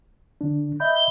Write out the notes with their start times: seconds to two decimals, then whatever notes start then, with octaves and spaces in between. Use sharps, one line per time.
0.41 D3 D4
0.80 D#5 E5 B5 G6
0.95 G7